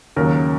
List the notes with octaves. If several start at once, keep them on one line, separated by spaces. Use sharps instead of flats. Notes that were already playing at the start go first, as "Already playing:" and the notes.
D#2 C#3 F#3 A#4